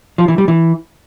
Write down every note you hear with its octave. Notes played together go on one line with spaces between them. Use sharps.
F3
E3
G3
E3